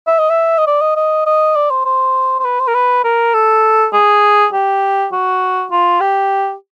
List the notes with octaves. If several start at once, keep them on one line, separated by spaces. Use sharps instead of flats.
E5
D#5
E5
D#5
D5
D#5
D#5
D#5
D5
C5
C5
C5
B4
C5
A#4
B4
A#4
A4
G#4
G4
F#4
F4
G4